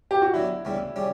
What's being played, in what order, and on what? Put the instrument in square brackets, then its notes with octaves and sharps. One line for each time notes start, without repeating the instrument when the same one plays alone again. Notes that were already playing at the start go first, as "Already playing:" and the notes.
[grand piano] G4
F#4
[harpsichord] D3 F#3 B3 [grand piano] E4
[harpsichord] D2 C#3 E3 G3 B3
C#3 G3 C#4 G4